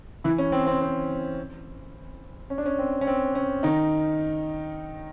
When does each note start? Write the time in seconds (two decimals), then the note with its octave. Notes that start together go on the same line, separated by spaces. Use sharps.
0.24 E3 E4
0.38 C#4
0.52 C4
0.67 C4
0.81 C4
2.50 C#4
2.58 D4
2.66 C#4
2.78 C4
3.01 C#4
3.07 C4
3.35 C#4
3.63 D#3 D#4